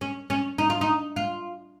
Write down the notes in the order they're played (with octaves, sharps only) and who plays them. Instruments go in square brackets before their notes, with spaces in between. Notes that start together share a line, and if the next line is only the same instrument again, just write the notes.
[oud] C#4
C#4
D#4
F4
D#4
F4